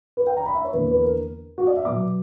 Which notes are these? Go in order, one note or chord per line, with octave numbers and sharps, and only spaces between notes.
B4
G5
A#5
B5
E5
C#5
E2 D3 A#3 B4
B4
A#4
F#4
D5
E5
B2 F#3 B3 D6